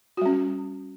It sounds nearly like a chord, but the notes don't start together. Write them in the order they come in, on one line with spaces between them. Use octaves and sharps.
F#4 G3 C#4